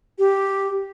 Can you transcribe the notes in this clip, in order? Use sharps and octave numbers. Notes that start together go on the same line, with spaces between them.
G4